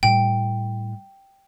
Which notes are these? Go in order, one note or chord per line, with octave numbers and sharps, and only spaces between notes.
A2 G3 G5